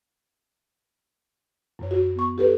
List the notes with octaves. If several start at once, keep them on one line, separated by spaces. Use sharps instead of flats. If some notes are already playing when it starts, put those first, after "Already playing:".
F#2 C#5
F#4
B3 C#6
G4 A4 B4